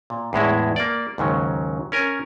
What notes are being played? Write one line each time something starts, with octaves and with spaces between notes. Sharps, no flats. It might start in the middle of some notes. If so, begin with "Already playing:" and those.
A#2
E2 A2 G#3 E4
A#3 D5
D#2 G#2 C#3 F#3
C#4 A#4 G#5